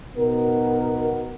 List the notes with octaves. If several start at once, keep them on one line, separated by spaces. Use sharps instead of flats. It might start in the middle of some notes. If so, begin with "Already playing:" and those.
B2 B3 D#4 F#4 A#4